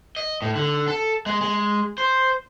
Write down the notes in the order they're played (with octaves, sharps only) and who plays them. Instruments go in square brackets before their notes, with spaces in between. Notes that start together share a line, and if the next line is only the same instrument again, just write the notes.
[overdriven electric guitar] D#5
A2
D3
A4
G#3
G#3
C5